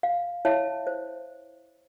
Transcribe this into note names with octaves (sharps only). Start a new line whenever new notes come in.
F5
E4 C#5 E5 F5 A5
C5